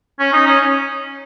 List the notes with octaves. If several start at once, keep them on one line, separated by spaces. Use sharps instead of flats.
C#4
D#4
C#4